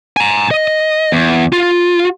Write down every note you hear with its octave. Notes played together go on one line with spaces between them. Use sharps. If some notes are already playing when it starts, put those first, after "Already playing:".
G#5 A#5
D#5
E2
F4